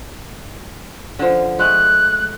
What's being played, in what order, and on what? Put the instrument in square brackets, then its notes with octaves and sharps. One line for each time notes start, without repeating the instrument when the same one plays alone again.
[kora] D3 F3
[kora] G#3 A3 [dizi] F#6